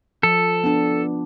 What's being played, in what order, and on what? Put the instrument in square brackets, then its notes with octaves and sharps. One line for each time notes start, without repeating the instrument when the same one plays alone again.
[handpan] F3 [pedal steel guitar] A4
[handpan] B3 D4